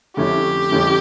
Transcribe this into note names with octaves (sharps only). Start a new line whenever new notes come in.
F2 D3 A3 C#4 E4 G4
F2 D3 A3 C#4 E4